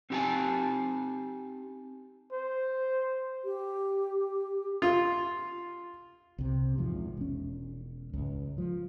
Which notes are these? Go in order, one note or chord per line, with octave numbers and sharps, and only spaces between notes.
C4 D#4 G4 F#5 G#5 A5
C5
G4
F4
C2 C3
A#1 E2 G#2 F3
E1 C#4
C#2 G#2
F3